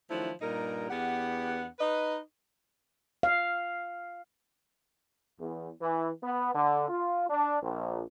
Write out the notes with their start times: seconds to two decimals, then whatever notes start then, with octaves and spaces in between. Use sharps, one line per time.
0.10 D#3 F3 F#3 A3 D4 E4
0.42 G2 A#2 G3 D#4 A#4
0.90 E2 B3 D4 G4 F#5
1.80 D#4 B4 D#5
3.23 F5
5.39 E2
5.80 E3
6.22 B3
6.53 D3
6.88 F4
7.29 D4
7.61 A#1